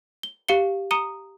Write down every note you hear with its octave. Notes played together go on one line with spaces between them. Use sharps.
G7
G4 F5 C#7 G7
A#5 D#6 C#7 D#7 G7